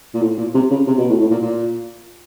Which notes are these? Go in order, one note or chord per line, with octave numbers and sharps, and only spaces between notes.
A#2
A2
A#2
C3
C#3
C3
B2
A2
A2
A#2
A#2